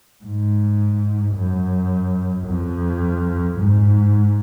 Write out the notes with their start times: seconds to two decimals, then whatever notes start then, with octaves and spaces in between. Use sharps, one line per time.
0.24 G#2
1.35 F#2
2.48 F2
3.60 G#2